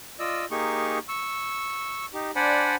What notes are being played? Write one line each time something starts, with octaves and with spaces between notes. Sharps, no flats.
F4 D5 D#5 E6
A#3 D#4 G4 G#4 C#6
C#6 E6
D#4 G4
D4 C5 D5 F#5 G#5 B5